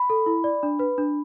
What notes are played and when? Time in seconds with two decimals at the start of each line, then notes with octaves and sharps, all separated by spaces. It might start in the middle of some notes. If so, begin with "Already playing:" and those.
Already playing: B5
0.10 A4
0.26 E4
0.44 D5
0.63 D4
0.79 B4
0.98 D4